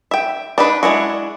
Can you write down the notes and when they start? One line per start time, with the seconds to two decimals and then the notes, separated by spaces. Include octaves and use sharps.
0.11 E5 G5
0.58 D4 D#4 B4
0.83 G#3 D4 E4 F#4